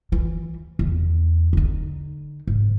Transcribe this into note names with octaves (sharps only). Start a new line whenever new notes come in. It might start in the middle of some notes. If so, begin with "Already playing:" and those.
E3 F4
E2
D3 D#4
G#2